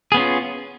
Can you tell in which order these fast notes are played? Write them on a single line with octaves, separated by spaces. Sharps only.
G#4 B3 C#4 F4